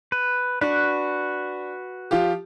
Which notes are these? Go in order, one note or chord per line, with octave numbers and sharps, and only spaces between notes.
B4
D4 F#4 B4
F3 F4 G4